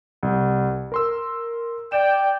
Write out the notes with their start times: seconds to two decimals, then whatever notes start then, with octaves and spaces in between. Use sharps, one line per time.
0.23 C2
0.92 A#4 C6 E6
1.92 D5 G5 E7